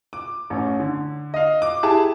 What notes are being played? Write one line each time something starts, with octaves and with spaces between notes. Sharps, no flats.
D6
A1 C#4
D3
D#5 F5
D6
E4 G4 G#4 A5